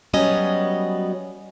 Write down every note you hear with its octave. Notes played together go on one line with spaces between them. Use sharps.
F#3 G3 B3 C#4 D#5